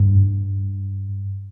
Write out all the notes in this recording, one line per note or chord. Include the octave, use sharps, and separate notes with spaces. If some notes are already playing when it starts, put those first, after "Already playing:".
Already playing: G2